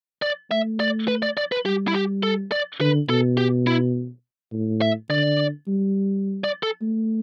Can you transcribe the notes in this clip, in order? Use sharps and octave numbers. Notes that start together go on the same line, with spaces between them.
D5
A3 E5
D5
B4
D5
D5
B4
G3 G4
E4
G4
A4
D5
D3 B4
B2 A4
G4
E4
A2
E5
D3 D5
G3
D5
A4
A3